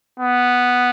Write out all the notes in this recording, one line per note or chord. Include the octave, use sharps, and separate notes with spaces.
B3